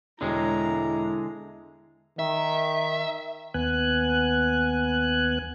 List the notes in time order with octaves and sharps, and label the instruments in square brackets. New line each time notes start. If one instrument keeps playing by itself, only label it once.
[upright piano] E1 [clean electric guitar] D3 G#3 [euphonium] E4 [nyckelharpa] A#5
[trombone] D#3 [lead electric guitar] E5
[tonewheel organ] D#2 B3 G#5 F#6